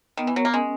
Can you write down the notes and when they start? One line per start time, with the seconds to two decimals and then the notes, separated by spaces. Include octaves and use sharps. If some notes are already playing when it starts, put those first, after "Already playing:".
0.17 D#3 B3
0.27 E3
0.36 F#3 A#4
0.45 A#3
0.54 G#3 C#4